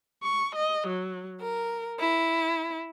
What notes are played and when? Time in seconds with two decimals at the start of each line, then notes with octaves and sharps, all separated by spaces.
0.22 C#6
0.55 D#5
0.88 F#3
1.42 A#4
2.00 E4